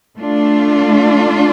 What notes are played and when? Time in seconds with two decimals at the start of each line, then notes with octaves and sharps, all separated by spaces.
0.19 A3 D4 F4